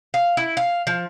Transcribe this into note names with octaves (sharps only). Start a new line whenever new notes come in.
F5
E4
F5
F3